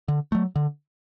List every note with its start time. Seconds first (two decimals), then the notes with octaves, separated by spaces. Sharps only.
0.08 D3
0.32 F#3 A3
0.56 D3